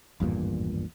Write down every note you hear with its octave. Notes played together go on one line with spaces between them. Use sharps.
G#1 E2 G2 A#2